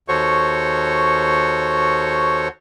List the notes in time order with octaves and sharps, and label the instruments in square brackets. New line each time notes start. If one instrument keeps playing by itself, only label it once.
[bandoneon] D#2 F#4 A4 C5 C#5 C#6